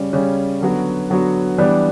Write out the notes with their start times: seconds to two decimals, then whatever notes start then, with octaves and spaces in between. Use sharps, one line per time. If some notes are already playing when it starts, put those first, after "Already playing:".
Already playing: C#3 G3 C#4
0.13 C#3 G3 C#4
0.61 D3 F#3 B3 F#4
1.10 D3 F#3 B3 F#4
1.58 E3 G3 B3 D4